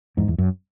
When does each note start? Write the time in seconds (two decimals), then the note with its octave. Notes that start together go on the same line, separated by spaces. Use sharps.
0.17 E2 G#2
0.28 E2
0.38 F#2